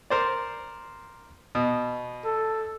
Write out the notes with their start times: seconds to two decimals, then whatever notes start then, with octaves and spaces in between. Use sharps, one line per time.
0.10 A#4 C5 D5
1.55 B2
2.25 A4